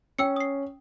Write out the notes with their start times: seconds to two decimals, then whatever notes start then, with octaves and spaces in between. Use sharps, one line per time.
0.18 C#4 G5 E6 C#7
0.36 D#6 C7